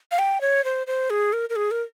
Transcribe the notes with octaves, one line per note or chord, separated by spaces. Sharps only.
F5
G5
C#5
C5
C5
G#4
A#4
A#4
G#4
A#4